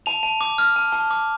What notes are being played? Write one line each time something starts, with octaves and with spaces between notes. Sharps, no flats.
A5 F7
A5
D6
F6
A5
A5
D6